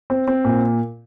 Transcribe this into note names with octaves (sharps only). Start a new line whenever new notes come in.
C4
C4
A#2